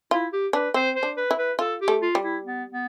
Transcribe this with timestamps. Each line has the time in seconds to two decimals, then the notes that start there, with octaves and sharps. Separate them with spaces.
0.11 E4 F4
0.33 G4
0.53 D4 B4
0.74 C4 C5
0.95 C5
1.03 D4
1.17 B4
1.31 E4
1.38 B4
1.59 F4 A4
1.81 G4
1.88 A3
2.02 F4
2.15 G3
2.23 E4
2.44 B3
2.72 B3